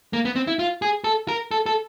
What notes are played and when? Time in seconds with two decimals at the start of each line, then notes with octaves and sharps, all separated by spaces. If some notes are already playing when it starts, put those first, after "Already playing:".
0.13 A#3
0.25 B3
0.36 C4
0.47 E4
0.59 F4
0.82 G#4
1.04 A4
1.28 A#4
1.51 A4
1.66 A4